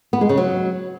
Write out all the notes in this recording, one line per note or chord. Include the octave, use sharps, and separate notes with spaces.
B3
G#3
C#3
F#3